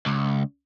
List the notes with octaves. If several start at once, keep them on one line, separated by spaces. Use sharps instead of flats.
C#2